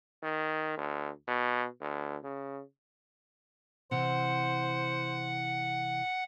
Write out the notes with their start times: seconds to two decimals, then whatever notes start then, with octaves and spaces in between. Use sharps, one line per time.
0.23 D#3
0.78 D2
1.28 B2
1.81 D2
2.24 C#3
3.91 C3 E3 C5 F#5